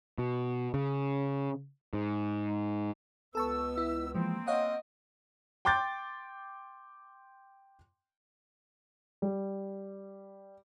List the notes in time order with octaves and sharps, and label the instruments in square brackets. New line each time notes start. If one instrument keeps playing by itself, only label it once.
[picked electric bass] B2
C#3
G#2
[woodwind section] C#2 E6 [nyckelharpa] B3 [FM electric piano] A4 A5 C#6
[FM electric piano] E4
[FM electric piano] E3 F3 G#3 [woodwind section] A#3 C4
[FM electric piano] C#5 F5 F#5 [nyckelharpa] D#5
[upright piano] G5 C6 D6 G6 A6
[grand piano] G3